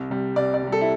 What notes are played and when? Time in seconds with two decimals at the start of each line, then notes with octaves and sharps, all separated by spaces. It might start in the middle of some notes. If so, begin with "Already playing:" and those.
Already playing: C2
0.10 C3 G3
0.36 C2 D5
0.54 D5
0.63 C3 G3
0.72 A4
0.81 E4